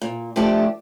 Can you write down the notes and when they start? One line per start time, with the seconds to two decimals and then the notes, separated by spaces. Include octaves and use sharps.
0.02 A#2
0.36 F3 A3 D4 G4